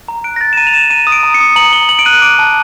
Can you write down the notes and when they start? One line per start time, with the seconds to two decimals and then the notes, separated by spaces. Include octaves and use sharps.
0.08 A#5
0.24 F#6 D7
0.36 A#6
0.41 A#5 A6
0.53 E7
0.57 A#5 D#7
0.67 F7
0.74 A#5 E7
0.90 A#5 D#7
1.07 D#6
1.12 D7
1.23 A#5
1.34 C#7
1.40 D#6
1.56 A#5 F#7
1.72 A#5 G7
1.89 A#5 F#7
1.99 D7
2.05 F#6 D#7
2.22 D6 D7
2.39 A5